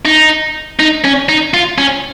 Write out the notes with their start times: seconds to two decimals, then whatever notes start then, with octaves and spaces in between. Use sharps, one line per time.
0.05 D#4
0.79 D#4
1.04 C#4
1.29 D#4
1.54 F4
1.78 C#4